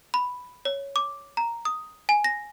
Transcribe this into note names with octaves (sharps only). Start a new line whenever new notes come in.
B5
C#5
D6
A#5
D#6
G#5
A#6